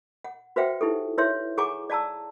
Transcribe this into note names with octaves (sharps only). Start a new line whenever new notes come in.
F#5
F#4 B4 C5 E5 F#5 G5
D#4 E4 G4 A4
E4 B4 C#5 E5 C6
G#4 F#5 G#5 A#5 C#6 D6
D5 F5 A5 A#5 E6